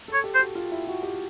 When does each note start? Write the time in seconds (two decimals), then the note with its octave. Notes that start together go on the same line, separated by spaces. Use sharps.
0.08 A4
0.13 C#5
0.24 G4
0.35 C5
0.39 F#4
0.55 F4
0.72 E4
0.87 F#4
1.03 G4